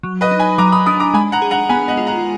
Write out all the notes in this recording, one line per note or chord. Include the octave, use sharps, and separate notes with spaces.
F#3
B4 D#5
D#4
G#5 B5
F#3 A#5 D6
B5 D#6
D4 B5 D#6
A#5 D6
G#3 G#5 B5
F#5 A#5
G#4
F#5 A#5
B3 G#5 B5
D#5 F#5
F4
F#5 A#5